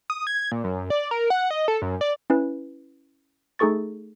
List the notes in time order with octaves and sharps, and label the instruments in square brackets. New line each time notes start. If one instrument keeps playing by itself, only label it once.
[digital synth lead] D#6
G#6
A#2
F#2
D5
A#4
F#5
D#5
A4
F#2
D5
[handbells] C#4 E4 B4
A3 D#4 G#4 A4 C#6 A6